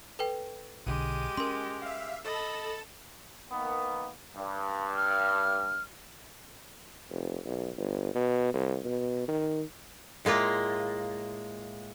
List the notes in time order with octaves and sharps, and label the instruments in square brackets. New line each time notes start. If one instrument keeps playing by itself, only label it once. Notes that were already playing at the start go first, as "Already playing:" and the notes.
[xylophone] A4 B4 G5
[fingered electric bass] B1 D3 [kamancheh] G#3 G4 [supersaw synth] D#7
[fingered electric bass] C#4 [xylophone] A#4 C6
[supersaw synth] E5 F5
[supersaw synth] A4 A6 E7 [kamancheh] D#5 B5
[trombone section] D#3 A#3 B3
G2
[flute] F6
[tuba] F1
B1
G1
B2
C2
B2
D#3
[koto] A2 G#3 A#3 F4